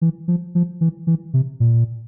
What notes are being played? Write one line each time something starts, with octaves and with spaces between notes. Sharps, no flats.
E3
F3
F3
E3
E3
C3
A#2